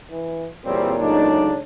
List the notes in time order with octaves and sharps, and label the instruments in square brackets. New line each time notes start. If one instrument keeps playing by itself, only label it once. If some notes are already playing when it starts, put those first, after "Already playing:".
[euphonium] E3
[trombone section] E2 G3 C4 [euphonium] A#2 [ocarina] C#5
[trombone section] C#2 C#3 D4 [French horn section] F#3 A3 D#4